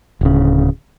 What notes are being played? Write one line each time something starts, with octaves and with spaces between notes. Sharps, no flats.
D1 C#3